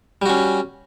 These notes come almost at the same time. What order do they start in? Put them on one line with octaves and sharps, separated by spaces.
G3 F#4 C#4